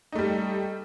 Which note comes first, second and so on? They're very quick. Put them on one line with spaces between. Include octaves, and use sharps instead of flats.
D#4 A3 G3